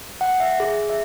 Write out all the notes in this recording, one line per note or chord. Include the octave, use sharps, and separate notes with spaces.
F#5
E5
G#4
E5